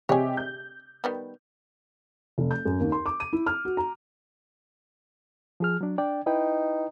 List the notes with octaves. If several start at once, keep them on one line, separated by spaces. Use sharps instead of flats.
C3 G4 G#4 C#5 D#5
G6
D#3 G3 B3
F1
G6
F#2
D#2
C6
D6
D#7
E4
F6
F#4
A#5
F3 G#4 F6
F#3 D4
D4 D5 G5
D#4 E4 B4 G5